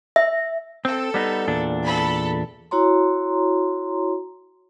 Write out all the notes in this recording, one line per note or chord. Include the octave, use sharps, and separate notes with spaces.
E5
C4 A4
G3 B3 D#4
E2 A#2 D4
A4 B5
E4 F#4 C#5 A#5 C6